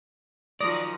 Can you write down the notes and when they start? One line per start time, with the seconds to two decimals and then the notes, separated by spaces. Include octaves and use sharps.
0.61 D#3 F3 F#3 D5 A#5 D#6 D#7